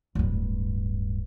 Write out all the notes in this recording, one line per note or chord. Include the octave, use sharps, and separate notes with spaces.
D1 G2